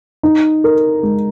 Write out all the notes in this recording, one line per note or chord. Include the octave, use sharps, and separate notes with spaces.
D#4
A#4
G#3